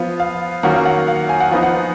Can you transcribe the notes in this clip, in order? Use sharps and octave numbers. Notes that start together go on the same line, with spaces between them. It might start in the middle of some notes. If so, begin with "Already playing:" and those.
Already playing: F3 B3 F4
F5
D#3 F#3 A#3 C#4 F4 F#5
F5
F#5
F5
G#5
F#5
F3 B3 D#4 F5
F#5